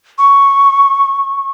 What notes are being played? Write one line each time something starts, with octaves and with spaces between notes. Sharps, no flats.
C#6